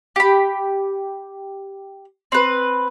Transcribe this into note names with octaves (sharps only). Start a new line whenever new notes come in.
G4 B5
C4 B4